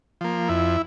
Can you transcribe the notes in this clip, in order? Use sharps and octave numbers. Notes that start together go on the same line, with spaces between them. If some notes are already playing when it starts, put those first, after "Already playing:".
F3 A#3
F2 E4